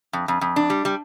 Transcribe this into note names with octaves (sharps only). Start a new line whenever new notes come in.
F2
F2
F2
D4
G3
G3